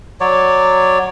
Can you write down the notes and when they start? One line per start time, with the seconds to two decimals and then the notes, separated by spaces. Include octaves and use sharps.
0.21 F#3 C#5 D5